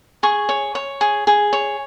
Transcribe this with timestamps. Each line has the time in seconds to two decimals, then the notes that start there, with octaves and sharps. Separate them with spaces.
0.23 G#4 C#6
0.49 C#5
0.75 C#5
1.01 G#4
1.27 G#4
1.53 C#5